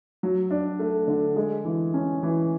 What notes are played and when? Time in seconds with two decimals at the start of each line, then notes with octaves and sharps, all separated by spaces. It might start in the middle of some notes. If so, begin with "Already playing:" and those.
0.23 F#3
0.50 D4
0.80 A3
1.08 D3
1.36 G#3
1.65 E3
1.94 C#4
2.23 E3